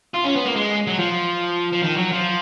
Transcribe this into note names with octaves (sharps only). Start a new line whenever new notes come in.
F4
C#4
B3
A#3
G#3
F#3
F3
F3
D#3
F#3
F3